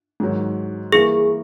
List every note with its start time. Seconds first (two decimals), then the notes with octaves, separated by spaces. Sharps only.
0.20 G#2 D#3 F#3
0.92 E3 G3 A#3 G#4